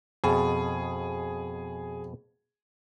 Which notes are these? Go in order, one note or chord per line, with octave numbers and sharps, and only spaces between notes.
F2 B2 G#4 A5